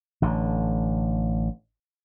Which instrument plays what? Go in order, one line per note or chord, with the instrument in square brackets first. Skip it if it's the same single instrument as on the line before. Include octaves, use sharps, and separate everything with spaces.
[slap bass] A1 D3